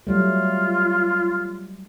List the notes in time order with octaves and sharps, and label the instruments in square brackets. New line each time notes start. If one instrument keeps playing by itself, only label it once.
[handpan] F#3 G3 A3 [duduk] F4